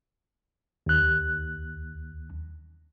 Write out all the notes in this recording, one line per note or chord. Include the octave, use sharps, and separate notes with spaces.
D#2 F#6